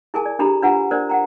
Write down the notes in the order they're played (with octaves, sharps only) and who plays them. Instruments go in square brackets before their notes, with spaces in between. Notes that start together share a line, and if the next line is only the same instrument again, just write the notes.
[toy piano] E4 G#4 A#4 G#5 A5
D5
D4 E4 G4 A4 A#5 B5
D4 F4 B4 F#5 G#5 A#5
D4 A#4 C5 D5
F#5 G5 A#5